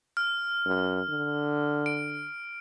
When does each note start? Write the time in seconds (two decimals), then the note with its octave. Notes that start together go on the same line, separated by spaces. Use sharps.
0.17 F6
0.66 F#2
1.09 D3
1.86 D7